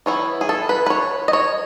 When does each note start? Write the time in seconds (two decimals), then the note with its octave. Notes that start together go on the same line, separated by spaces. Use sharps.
0.06 E3 B3 E4 C#5
0.41 G#4
0.49 A4
0.69 B4
0.86 B4
0.90 C#5
1.28 D#5
1.33 C#5